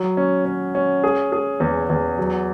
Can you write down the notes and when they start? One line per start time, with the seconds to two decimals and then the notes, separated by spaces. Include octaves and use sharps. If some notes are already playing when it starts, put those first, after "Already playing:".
Already playing: F#3
0.17 C#4
0.45 C#4
0.75 C#4
1.04 G#4
1.32 G#4
1.60 E2
1.90 E2
2.18 F#3